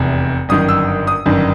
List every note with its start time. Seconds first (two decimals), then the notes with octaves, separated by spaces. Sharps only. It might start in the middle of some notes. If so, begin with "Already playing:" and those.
Already playing: F1 E2 C3
0.49 G1 F#2 D#3 D#6
0.69 E6
1.07 D#6
1.26 G1 F#2 D#3